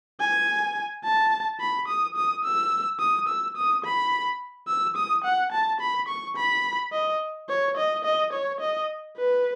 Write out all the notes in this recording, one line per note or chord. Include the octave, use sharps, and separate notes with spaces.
G#5
A5
B5
D#6
D#6
E6
D#6
E6
D#6
B5
E6
D#6
F#5
A5
B5
C#6
B5
D#5
C#5
D#5
D#5
C#5
D#5
B4